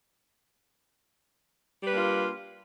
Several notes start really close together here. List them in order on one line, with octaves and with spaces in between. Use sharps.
G3 B4 D4 A#3 F4